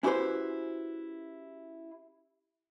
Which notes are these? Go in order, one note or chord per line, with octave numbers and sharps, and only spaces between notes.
C#4 E4 F#4 G4 B4 C5